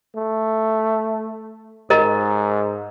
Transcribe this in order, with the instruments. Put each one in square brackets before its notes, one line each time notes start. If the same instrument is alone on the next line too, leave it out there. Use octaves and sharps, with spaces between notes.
[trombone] A3
[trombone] G#2 [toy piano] A#4 D#5 A#5